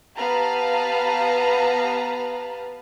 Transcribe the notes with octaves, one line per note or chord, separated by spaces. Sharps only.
B3 G4 B4 F5 A5 A#5